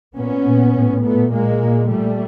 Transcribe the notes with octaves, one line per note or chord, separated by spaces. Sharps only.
A#2 B3 C#4
A#2
A2
A#2 A3 B3
A#2 G#3 A#3
A#2
A#2 G3 A3